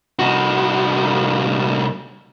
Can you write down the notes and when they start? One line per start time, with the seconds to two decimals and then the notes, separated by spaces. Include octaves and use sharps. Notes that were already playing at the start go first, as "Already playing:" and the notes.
0.19 C2 F#4